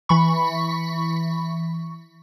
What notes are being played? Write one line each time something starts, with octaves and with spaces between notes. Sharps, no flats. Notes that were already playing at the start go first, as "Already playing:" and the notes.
E3 B5 C#6